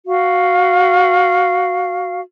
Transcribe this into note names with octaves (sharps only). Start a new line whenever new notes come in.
F#4 F5